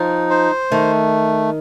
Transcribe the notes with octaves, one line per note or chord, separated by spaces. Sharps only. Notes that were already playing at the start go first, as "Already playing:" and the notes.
Already playing: F3 D#4
C5
D#3 A3